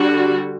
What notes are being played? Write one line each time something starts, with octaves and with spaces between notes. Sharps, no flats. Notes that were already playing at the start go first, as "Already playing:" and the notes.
Already playing: D3 G3 D4 F#4